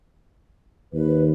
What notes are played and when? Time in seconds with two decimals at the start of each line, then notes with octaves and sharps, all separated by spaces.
0.93 D#2 B4